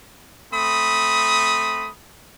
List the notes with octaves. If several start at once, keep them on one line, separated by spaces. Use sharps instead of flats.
A3 C4 B5 D#6